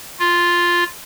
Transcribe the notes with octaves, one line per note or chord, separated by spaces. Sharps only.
F4